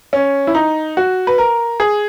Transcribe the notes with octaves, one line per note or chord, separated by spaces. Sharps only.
C#4
E4
D#4
F#4
B4
A#4
G#4